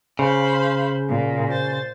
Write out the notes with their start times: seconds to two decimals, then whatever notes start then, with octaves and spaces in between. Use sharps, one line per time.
0.19 C#3 C5 F5 B5
1.09 A#2
1.50 C5 A6